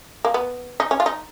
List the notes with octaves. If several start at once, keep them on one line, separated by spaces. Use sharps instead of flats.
A#3
B3
D#4
C#4
F4
D#4